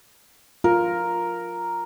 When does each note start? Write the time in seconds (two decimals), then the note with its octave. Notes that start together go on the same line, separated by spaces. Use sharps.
0.64 F4 A#4